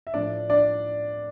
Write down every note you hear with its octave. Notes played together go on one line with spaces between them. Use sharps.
E5
A2 F3 D4 D5
D4 D5